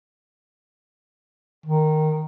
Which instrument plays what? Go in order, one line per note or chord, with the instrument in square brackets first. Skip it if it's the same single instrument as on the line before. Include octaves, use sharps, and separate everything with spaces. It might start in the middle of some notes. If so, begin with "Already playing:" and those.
[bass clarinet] D#3